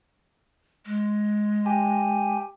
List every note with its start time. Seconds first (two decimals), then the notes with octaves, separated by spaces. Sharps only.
0.86 G#3
1.66 G4 G#5